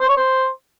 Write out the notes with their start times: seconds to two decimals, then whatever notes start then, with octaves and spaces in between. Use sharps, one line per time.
0.01 C5
0.09 C#5
0.17 C5